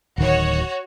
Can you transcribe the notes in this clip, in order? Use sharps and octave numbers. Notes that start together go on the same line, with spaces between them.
D1 D#3 F#4 C#5